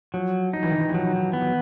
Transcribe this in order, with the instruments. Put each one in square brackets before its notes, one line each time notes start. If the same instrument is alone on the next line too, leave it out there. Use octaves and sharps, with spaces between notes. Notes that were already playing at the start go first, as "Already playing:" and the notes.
[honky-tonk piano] F3 [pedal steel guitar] F#3
[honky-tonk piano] F3 [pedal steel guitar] D#4
[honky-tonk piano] E3
D#3
E3
E3
[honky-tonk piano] F3 [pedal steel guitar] F#3
[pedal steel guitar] B3